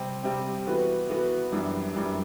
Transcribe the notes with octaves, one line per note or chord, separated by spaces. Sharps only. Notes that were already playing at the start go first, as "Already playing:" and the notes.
Already playing: C3 G3 C4
C3 G3 C4
E3 B3 F#4 B4
E3 B3 F#4 B4
F#2 E3 G3 D4
F#2 E3 G3 D4